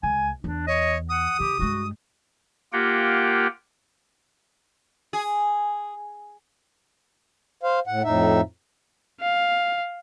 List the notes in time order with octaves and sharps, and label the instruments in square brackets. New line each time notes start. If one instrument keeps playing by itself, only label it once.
[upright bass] C#2 [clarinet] G#5
[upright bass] E2 [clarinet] D4
[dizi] C#5 [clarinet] D#5
[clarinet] F#5 [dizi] D#6
[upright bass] C#3 [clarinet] G4
[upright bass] G2 G#3 [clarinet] F#4
[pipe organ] A#3 F4 G4 A#4 F#5 G5
[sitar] G#4
[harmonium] C5 F5
A2 F#5
F2 A2 D#4 E5
[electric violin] F5